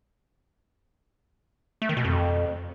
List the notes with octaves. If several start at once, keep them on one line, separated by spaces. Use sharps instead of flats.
A3
D#3
B2
F2